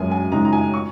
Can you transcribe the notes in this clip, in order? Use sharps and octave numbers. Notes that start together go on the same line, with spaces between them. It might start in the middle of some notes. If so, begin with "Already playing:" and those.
Already playing: F#2 C#3 G#3 G#5
G#5
C#3 G#3 D#4 A#5
A#5
G#5
C#6